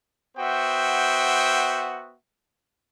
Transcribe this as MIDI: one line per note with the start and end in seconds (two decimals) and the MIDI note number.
0.37 2.14 59
0.37 2.14 66
0.37 2.14 72
0.37 2.14 76
0.37 2.14 79